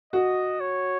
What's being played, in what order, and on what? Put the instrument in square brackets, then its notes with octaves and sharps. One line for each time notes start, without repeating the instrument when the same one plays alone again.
[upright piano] F#4 [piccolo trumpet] D#5
[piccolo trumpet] C#5